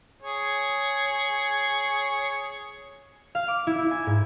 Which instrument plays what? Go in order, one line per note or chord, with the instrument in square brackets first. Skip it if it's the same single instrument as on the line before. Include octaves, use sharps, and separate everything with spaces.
[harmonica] G#4 C#5
[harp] F5
D6
E4
E4
G#5
G#2